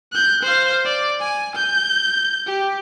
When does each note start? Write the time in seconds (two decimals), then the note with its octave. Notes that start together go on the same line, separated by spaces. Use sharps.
0.12 F#6 G6
0.43 C5 F5
0.85 D5
1.20 G#5
1.55 G6
2.47 G4